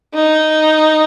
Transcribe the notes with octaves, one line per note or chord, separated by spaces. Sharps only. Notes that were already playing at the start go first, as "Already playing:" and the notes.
D#4